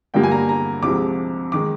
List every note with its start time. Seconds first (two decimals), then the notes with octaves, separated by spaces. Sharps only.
0.14 G2 D3 G3 A#3 G5
0.23 G#5
0.32 A#5
0.49 A#5
0.83 C2 C3 F3 G#3 D6
1.52 D#3 G#3 D6